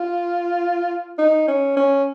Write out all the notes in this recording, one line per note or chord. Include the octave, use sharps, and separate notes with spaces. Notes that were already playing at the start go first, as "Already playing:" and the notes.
Already playing: F4
D#4
C#4
C#4